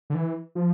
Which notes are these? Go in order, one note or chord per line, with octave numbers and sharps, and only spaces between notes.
D3
E3
F3